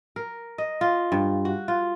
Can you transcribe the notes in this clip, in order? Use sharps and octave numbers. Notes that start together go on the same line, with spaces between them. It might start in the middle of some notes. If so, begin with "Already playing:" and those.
A#4
D#5
F4
G2
F#4
F4